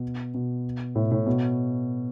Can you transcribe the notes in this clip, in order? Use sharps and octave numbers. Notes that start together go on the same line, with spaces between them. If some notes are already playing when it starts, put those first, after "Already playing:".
Already playing: B2
B2
A2
A2
B2